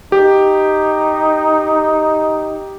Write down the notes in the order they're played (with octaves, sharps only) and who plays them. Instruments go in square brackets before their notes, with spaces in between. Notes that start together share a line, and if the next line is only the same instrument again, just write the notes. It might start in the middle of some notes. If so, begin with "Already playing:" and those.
[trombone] D#4 [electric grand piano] G4